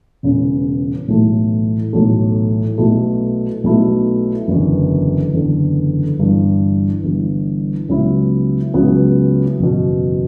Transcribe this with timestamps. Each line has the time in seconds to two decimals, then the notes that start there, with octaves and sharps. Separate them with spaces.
0.23 E1 E2 C#3
1.08 B1 A2 E3 A3
1.93 B1 A2 E3 A3
2.78 B1 B2 A3 E4
3.64 B1 B2 A3 E4
4.48 F#1 E2 D3
5.33 F#1 E2 D3
6.18 G1 G2 E3
7.03 G1 G2 E3
7.89 C#2 C#3 F#3 B3 E4
8.74 C#2 C#3 F#3 B3 E4
9.59 F#1 E2 B2